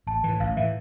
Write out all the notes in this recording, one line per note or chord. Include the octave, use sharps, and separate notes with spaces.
A1 A5
A2 E3
A1 F5
A2 E3 E5